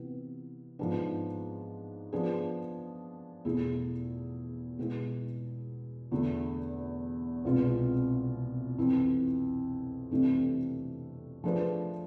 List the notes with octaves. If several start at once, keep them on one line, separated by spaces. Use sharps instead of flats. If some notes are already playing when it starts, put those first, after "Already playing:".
Already playing: C3 E3 B3 E4
G#2 F3 B3 D4
F3 B3 D4 G#4
E2 B2 A3 E4 G#4
B2 G#3 B3 E4 G#4
E2 D3 A3
C2 B2 G#3 B3 F4
F2 E3 B3 E4
F2 C3 E3 A3 D4
F3 A3 D4 G#4 B4